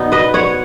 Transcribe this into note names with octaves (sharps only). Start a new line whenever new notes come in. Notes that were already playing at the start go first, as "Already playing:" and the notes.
Already playing: B2 B3 D#4
B4 D#5
C#5 F#5